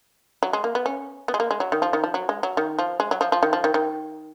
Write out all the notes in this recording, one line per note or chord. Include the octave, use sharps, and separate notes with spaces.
F#3
G#3
A#3
B3
C#4
B3
G#3
A#3
G#3
F#3
D#3
F3
D#3
F3
F#3
G#3
F#3
D#3
F3
G#3
F#3
F3
F3
D#3
F3
D#3
D#3